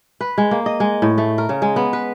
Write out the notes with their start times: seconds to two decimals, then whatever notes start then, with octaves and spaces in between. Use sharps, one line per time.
0.21 B4
0.38 G#3
0.51 A#3
0.66 D#5
0.80 G#3
1.02 A2
1.18 A3
1.38 A#4
1.49 C#3
1.62 G#3
1.76 B3
1.93 B4